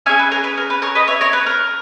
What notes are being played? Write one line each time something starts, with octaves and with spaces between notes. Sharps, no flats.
C#4 G#4 E5 G#5
B4
A#4
B4
A#4
B4
A#4 C#5
B4 D#5
C#5 E5
A#4 C#5
B4
A#4